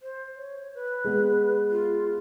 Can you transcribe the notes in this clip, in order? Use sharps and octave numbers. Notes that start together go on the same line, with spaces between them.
C5
C#5
B4
G#3 B3
F4